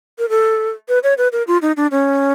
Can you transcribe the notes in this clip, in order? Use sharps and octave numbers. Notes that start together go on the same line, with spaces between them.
A#4
A4
B4
C#5
B4
A#4
F4
D#4
D4
C#4